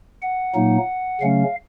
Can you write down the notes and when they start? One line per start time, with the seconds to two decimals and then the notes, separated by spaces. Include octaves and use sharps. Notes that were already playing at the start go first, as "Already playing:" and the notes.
0.22 F#5
0.55 A#2 F#3 A#3 D#4
1.21 C#3 F#3 A3 C#4 F5